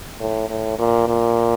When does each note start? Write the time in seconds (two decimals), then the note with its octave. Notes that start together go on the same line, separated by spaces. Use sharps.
0.20 A2
0.50 A2
0.79 A#2
1.08 A#2